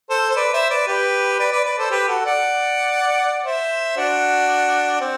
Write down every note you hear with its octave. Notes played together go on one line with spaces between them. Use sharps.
A4 C5
C5
B4 D5
C5 E5
B4 D5
G4 B4
B4 D5
B4 D5
B4 D5
A4 C5
G4 B4
F#4 A4
D5 F#5
C5 E5
D4 F#4
C4